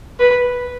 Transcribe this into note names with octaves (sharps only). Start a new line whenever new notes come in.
B4